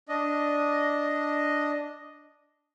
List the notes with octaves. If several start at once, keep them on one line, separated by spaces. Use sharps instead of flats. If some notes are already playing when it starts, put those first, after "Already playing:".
D4 D#5